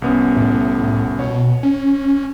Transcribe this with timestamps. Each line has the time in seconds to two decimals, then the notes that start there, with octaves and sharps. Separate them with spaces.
0.02 C2 B3 C#4
0.36 A2
1.19 B2 C#5
1.63 C#4